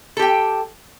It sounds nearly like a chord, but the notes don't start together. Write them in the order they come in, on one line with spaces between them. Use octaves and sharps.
A4 G4 G5